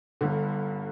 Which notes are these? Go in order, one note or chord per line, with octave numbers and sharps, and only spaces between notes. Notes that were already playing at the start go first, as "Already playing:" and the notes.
G1 G2 D3